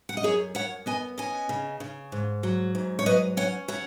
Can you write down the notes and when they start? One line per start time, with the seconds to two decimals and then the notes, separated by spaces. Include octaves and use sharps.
0.09 F#5
0.17 D#5
0.23 F#2 G#4 C#5
0.55 F#2 C#5 F#5
0.86 B3 D#5 G#5
1.18 C#4 D#5 G#5
1.49 C#3
1.80 C#3
2.12 G#2
2.43 F#3
2.75 G#2
2.99 C#5
3.06 F#3 B4 D#5
3.37 C#4 C#5 F#5
3.68 F#3 C#5 F#5